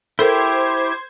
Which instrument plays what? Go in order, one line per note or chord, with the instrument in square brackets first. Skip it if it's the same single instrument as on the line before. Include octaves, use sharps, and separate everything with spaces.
[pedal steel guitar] E4 G4 [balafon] A4 A#4 [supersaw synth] C5 G#6